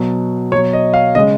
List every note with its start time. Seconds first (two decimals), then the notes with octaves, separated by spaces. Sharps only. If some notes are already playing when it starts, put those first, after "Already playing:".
Already playing: B2 F#3
0.52 B2 C#5
0.55 F#3
0.73 D#5
0.94 F5
1.15 C#3 G#3 D#5